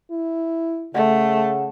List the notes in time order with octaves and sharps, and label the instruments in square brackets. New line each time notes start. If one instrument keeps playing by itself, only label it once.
[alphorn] E4
[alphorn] C#3 [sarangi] A3 [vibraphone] F#5